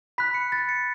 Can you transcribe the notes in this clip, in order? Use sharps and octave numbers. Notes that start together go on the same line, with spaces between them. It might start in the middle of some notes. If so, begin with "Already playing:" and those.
B5 F#6 B6
C#7
A6
C#7